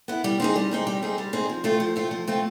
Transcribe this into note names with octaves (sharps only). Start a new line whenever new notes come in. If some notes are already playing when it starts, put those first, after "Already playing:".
B3 E4
G3
C4 D#4 G#4
G3
C4 D#4 G#4
G3
C4 D#4 G#4
G3
C4 D#4 G#4
F3
A3 C4 F4
F3
A3 C4 F4
F3
A3 C4 F4